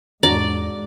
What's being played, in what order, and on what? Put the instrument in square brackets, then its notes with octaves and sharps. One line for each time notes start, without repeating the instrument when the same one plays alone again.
[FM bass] E2 [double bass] G#2 [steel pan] D4 F#4 A#5 [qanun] D5